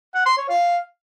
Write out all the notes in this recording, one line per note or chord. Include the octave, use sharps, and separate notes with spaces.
F#5
C6
C#5
F5